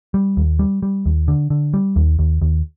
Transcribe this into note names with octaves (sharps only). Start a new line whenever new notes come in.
G3
D#2
G3
G3
D#2
D3
D3
G3
D#2
D#2
D#2